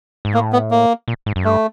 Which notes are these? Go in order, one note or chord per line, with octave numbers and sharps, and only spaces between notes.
G#2
A2 A#3
B3
A#3
A#2
G#2
F#2
G2 A3